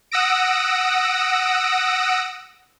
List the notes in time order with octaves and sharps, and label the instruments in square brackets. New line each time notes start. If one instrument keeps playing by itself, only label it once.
[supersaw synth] F#5 D#6 E6 A#6 D7